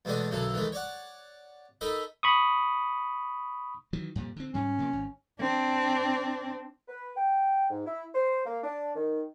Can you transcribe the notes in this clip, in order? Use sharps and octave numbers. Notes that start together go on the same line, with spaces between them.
E2 B2 G#3 A3 D4 G#5
B1 F#2 D3 F#3 A4
D#3 E3 G#3 A3
C#5 D5 F#5
D#4 A4 A#4 D#5 B5
B5 C#6 D#6
D#3 E3 F#3
F2 A#2 G3
D3 C4
G#2 C#3 G3 C#4
C3 F3 A#3
G#1
C4 D4
B4
G5
G#2
E4
C5
A#3
D4
D#3